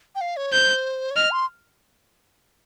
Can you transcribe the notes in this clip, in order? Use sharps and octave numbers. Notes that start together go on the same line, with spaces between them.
G5
F5
C#5
C5 G6
C#5
D#5 F6
C6